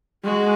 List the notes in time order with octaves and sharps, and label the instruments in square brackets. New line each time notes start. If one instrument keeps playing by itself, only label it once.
[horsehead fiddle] G#3 [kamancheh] F#4